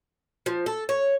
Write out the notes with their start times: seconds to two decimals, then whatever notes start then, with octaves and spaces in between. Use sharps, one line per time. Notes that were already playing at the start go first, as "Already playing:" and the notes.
0.46 F3
0.66 A4
0.89 C#5